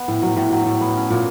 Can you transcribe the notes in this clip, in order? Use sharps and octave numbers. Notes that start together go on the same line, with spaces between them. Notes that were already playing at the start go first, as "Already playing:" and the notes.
Already playing: B3
A2
F#3
A2
F#3
A2
B3
C#4
A#2